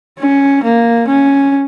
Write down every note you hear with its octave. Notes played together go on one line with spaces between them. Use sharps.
C#4
A#3
C#4